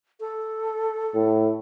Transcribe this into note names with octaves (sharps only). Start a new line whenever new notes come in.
A4
A2